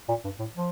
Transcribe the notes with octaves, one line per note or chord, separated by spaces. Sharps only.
A#2
G2
A2
F3